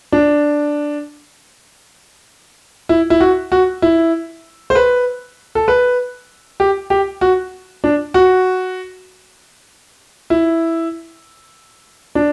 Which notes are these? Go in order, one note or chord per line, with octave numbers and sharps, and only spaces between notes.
D4
E4
E4
F#4
F#4
E4
C5
B4
A4
B4
G4
G4
F#4
D4
F#4
E4
D4